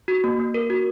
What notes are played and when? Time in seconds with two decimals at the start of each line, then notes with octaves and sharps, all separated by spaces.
0.08 F#4
0.24 A#3
0.40 A#3
0.54 A#4
0.70 F#4